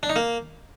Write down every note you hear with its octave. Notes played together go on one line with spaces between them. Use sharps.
D4
D#4
A#3